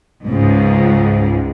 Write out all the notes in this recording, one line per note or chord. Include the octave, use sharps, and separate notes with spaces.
C#2 G#2